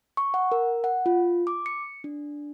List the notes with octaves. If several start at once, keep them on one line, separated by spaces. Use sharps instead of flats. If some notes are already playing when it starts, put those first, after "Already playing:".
C#6
F#5
A#4
F#5
F4
D6
C#7
D4